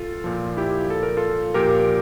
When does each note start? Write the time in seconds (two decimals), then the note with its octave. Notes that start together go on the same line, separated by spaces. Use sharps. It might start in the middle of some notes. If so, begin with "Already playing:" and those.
Already playing: F4 A4
0.24 A#2 F3
0.57 E4 G4
0.90 A4
1.03 A#4
1.17 F4 A4
1.54 A#2 F3 G4 A#4